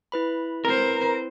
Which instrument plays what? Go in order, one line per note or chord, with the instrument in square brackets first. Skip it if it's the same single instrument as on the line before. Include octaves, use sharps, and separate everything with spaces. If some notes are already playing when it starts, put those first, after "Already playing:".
[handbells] E4 B4 B5
[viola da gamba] C4 C5 [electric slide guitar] A#4